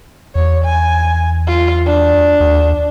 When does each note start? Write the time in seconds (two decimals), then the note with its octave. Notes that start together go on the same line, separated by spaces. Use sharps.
0.35 E2 C#5
0.65 G#5
1.47 F4
1.86 D4
2.40 D#2